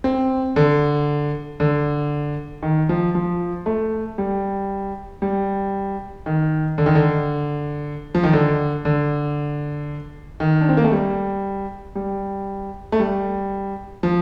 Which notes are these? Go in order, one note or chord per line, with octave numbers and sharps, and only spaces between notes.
C4
D3
D3
D#3
F3
F3
A3
G3
G3
D#3
D3
D#3
D3
F3
D#3
D3
D3
D#3
D4
C4
A#3
A3
G3
G3
A3
G3
F3